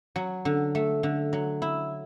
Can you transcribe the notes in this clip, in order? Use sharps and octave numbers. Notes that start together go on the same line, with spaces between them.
F#3
D3
A3
D3
F#3
E4